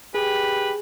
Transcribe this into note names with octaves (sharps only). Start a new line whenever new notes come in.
G4 G#4 B4